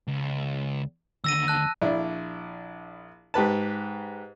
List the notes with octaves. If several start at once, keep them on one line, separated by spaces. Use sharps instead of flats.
C#2
D#2 D3 E6 A#6 D#7
A5 F#6
A#1 D4 E4
G#2 G4 B4 A5